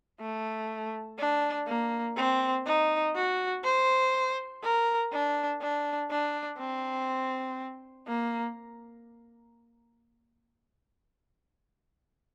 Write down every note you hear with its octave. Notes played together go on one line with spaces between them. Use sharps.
A3
D4
A#3
C4
D#4
F#4
C5
A#4
D4
D4
D4
C4
A#3